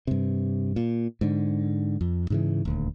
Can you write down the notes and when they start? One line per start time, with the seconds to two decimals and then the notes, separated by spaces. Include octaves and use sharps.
0.07 G2 C3
0.76 A#2
1.21 G#2 D3
2.01 F2
2.30 G#2 C#3 E3
2.65 D#1 D2